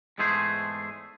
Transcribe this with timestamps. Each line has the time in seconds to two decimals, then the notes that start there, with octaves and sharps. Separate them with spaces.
0.18 E2 G#2 G#3 A3 G#4 C5